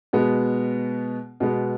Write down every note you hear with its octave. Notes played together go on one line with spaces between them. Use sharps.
B2 G#3 B3
B2 G#3 B3